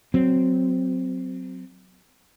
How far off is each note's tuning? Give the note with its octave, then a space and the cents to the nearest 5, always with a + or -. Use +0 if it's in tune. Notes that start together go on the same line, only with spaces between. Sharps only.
F#3 +0 C4 -15